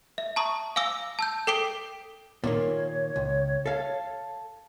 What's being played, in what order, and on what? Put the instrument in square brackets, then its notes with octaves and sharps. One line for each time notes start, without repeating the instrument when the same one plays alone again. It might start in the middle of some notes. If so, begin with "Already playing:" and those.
[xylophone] E5
A5 A#5 C#6 D#6
F5 G#5 D6 E6 A#6
A5 E6 G6
A4 G5 D6 B6 D7 G7
[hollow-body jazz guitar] A#2 D#3 A#3 [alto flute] C#5
[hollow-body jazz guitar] C#2
A4 F5